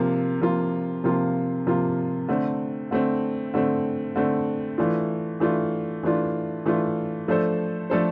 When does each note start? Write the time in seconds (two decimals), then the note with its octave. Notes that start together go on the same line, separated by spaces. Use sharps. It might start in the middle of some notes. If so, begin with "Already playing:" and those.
Already playing: C3 F3 A#3 F4
0.41 C3 F3 A#3 F4
1.04 C3 F3 A#3 F4
1.67 C3 F3 A#3 F4
2.28 D3 A3 C4
2.91 D3 A3 C4
3.54 D3 A3 C4
4.16 D3 A3 C4
4.78 E3 A3 D4 F4
5.40 E3 A3 D4 F4
6.03 E3 A3 D4 F4
6.66 E3 A3 D4 F4
7.28 F3 A3 D4 A4 C5
7.90 F3 A3 D4 A4 C5